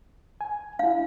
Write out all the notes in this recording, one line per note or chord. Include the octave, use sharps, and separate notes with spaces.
G#5
D4 E4 F5